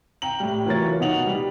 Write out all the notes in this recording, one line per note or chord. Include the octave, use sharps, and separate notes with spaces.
G5 A#5 F#7
A2 G3
E3 F#3 F4 A#4 C#5 A6
B2 D#4 F#5 F7 F#7
G3